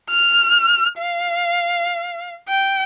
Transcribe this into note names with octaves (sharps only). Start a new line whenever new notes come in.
F6
F5
G5